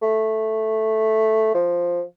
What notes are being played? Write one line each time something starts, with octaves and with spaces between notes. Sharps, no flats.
A3
F3